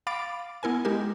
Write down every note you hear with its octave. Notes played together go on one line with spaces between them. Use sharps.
F5 B5 D6 A6 D7
B3 E4 A#4 G#5
G#3 D#4 G4 A#4